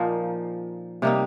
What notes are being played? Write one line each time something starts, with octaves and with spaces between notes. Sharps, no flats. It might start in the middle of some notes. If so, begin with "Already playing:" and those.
Already playing: A#2 F3 A#3 D#4
C3 G3 A#3 D#4